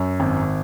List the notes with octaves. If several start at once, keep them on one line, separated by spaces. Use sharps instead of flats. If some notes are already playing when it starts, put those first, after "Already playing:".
Already playing: F#2
G#1